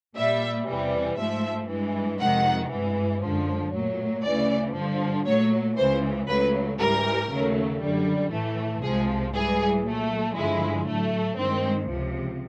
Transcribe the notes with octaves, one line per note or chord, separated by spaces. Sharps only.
A#2 G3 E5
E2 C3 E3 G3
G#2 F3 A3 E5
G2 E3 G#3
F2 C3 D#3 G#3 F#5
G2 E3 G#3
F#2 D3 F3 G#3
A#2 F#3 A3
D2 C#3 E3 D5
G2 D3 F3
A#2 F#3 A3 C#5
C#2 C#3 E3 C5
C#2 C#3 F#3 A3 B4
G#2 E3 G3 A#4
D#2 C#3 F#3 A3
F#2 D3 G3
A2 E3 A3
C2 C3 F3 G#3 G#4
G#2 E3 G3 G#4
A#2 F#3 A3
G2 D3 F3 G#3 E4
A2 F#3 A3
G2 D#3 G#3 C4
C#2 C3 F3